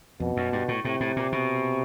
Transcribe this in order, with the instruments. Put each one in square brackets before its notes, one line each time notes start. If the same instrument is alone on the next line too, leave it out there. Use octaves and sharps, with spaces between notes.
[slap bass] F2 [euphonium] B2
[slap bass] F#2
G2
A2
[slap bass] A2 [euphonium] C3
[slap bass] A2
A#2
B2